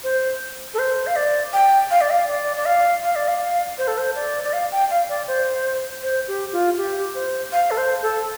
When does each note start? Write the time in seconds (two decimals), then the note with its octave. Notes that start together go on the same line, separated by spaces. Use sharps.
0.04 C5
0.74 A4
0.79 C5
1.07 F5
1.16 D5
1.53 G5
1.91 F5
2.01 D5
2.11 F5
2.28 D5
2.57 D5
2.66 F5
3.03 F5
3.16 D5
3.28 F5
3.78 C5
3.88 A4
3.98 C5
4.15 D5
4.44 D5
4.53 F5
4.72 G5
4.90 F5
5.09 D5
5.28 C5
6.03 C5
6.28 G4
6.52 F4
6.78 G4
7.15 C5
7.52 F5
7.71 A4
7.78 C5
8.03 A4